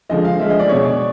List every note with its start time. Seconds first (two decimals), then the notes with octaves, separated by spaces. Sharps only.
0.09 D3 F3 G#3 D#5
0.25 F5
0.40 D3 F3 G#3 E5
0.50 D#5
0.59 D5
0.69 B2 G#3 C#5
0.85 D5